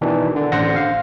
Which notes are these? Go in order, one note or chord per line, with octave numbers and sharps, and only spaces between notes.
B2 D#3 E3 D4
D3
A1 D3 C5 F#5 A#6
F5